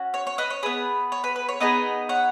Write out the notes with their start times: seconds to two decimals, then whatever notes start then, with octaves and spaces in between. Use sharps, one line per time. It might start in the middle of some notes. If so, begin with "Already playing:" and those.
Already playing: C#4 F#4
0.14 C#5
0.27 C#5
0.38 B4 D#5
0.50 C#5
0.63 B3 G#4 B4
1.12 C#5
1.24 B4
1.36 B4
1.49 C#5
1.60 B3 D#4 G#4 B4 D#5
2.09 C#5 F#5